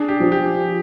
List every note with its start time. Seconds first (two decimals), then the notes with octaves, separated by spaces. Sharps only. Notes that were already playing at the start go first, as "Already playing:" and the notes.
Already playing: D4 G#4
0.08 G4
0.20 F3
0.32 G4